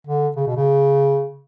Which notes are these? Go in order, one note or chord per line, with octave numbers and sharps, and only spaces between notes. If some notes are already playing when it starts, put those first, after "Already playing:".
D3
C#3
B2
C#3